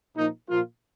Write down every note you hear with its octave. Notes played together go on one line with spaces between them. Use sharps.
A#2 F3 A#3 D#4
A#2 F3 A#3 F4